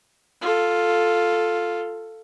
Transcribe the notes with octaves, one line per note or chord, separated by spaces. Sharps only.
F4 A4